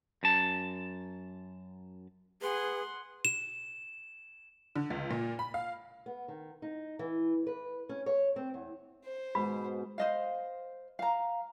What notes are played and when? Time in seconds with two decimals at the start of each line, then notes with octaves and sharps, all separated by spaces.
0.23 F#2 A5
2.42 G#4 B4 F#5 C6
3.25 E7
4.76 D3
4.90 C#2
5.11 A#2
5.39 B5
5.54 F5
6.06 B3
6.28 D#3
6.62 D#4
6.99 E3
7.47 B4
7.89 C#4
8.06 C#5
8.36 C4
8.54 E2
9.05 C5
9.35 G#2 B2 G#3 B5
9.98 C5 D#5 F5
10.99 F5 A#5